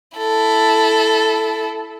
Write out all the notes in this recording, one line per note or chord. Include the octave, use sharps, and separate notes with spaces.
E4 A4